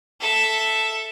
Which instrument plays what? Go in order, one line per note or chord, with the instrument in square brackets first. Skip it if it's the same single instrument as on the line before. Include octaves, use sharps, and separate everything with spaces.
[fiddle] A4 E5